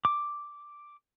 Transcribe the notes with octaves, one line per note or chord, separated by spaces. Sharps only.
D6